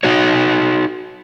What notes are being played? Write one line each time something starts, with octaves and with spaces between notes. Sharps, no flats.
D#4 F#4 C#5